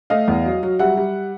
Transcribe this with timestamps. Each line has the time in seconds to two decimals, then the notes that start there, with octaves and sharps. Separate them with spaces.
0.10 A3 D#5 F5
0.28 E2
0.46 F#3
0.63 F#3
0.79 G3 E5 F#5
0.97 G3